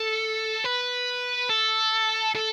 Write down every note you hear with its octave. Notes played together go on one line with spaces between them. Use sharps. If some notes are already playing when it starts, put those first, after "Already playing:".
Already playing: A4
B4
A4
A4